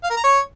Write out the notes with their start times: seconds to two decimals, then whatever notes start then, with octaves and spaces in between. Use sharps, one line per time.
0.03 F5
0.10 A#4
0.17 A#5
0.24 C#5